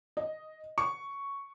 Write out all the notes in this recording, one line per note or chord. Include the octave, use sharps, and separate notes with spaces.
D#5
C#6